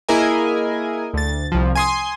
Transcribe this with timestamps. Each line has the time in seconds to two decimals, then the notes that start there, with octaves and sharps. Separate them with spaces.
0.09 A#3 E4 G#4 A#4 D#5 G#5
1.14 D2 A6
1.52 C2 F3
1.75 G#5 C6 D#6